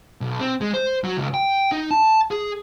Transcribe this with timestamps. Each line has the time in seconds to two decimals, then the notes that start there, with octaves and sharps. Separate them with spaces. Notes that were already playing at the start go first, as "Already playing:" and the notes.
0.21 B1
0.40 C4
0.61 G#3
0.74 C5
1.04 F#3
1.17 C#2
1.34 G5
1.72 D#4
1.91 A5
2.31 G#4